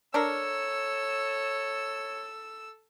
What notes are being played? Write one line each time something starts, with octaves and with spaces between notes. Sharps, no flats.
D4 A4 A#4 C#5 E6